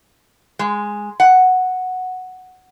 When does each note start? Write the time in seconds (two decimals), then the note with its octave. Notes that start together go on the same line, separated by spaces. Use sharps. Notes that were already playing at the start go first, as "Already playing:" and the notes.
0.59 G#3
1.20 F#5